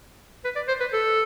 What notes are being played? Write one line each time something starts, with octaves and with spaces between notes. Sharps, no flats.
B4
D5
C5
B4
A4